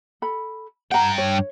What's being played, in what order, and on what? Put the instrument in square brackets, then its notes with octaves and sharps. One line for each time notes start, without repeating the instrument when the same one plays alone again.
[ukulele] A4 B5
[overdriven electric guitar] G2 G5 [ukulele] F#5 A#5
[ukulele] C#5